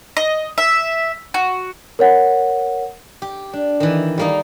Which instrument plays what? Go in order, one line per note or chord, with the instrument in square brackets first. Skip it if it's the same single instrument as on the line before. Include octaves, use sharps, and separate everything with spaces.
[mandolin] D#5
E5
F#4
[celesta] A#4 C#5 F#5
[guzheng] G4
D4
D#3 E3
G3 A#3 D#4